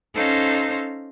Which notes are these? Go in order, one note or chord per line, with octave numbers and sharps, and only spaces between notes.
C#4 D#4 A4 C5 F5 A#5